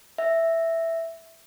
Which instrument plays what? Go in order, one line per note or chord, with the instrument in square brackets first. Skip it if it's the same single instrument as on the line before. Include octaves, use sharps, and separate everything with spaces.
[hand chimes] E5